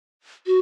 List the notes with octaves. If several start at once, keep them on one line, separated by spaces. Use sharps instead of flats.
F#4